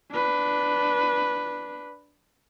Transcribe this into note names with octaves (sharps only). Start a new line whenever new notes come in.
D4 B4